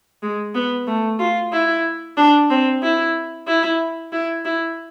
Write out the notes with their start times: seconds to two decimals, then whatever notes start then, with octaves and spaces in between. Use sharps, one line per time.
0.23 G#3
0.55 B3
0.87 A3
1.19 F4
1.53 E4
2.17 D4
2.50 C4
2.83 E4
3.48 E4
4.13 E4
4.45 E4